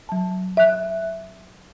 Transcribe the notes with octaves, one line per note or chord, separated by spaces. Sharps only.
F#3 A5
E5 F#6